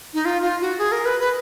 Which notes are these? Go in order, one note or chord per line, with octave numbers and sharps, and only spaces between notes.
D#4
F4
F4
F#4
G#4
A#4
B4
B4